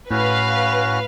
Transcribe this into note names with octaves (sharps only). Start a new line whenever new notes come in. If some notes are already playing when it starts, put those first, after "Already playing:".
A2 C#4 F#4 B4 F5